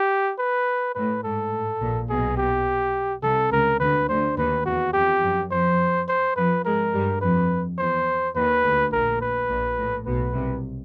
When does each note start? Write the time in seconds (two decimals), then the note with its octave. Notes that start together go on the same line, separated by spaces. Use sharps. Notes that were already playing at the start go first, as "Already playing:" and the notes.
Already playing: G4
0.39 B4
0.95 A2 B4
1.24 G#2 A4
1.52 A2
1.81 A#1 A#2
2.10 B1 B2 G#4
2.37 G4
3.23 C2 C3 A4
3.51 C#2 C#3 A#4
3.80 D2 D3 B4
4.09 D2 D3 C5
4.37 D#2 D#3 B4
4.65 E2 E3 F#4
4.93 F2 F3 G4
5.22 F#2 F#3
5.51 F2 F3 C5
6.08 C5
6.36 F2 F3 B4
6.65 G#2 G#3 A#4
6.93 G2 G3
7.21 F2 F3 B4
7.78 E2 E3 C5
8.35 D#2 D#3 B4
8.63 D2 D3
8.92 A#1 A#2 A#4
9.21 B4
9.49 A#1 A#2
9.78 A2
10.06 B1 B2 B4
10.34 C2 C3